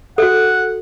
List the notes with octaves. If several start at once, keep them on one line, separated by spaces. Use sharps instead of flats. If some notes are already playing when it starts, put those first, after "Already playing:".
F#4 A4 F#5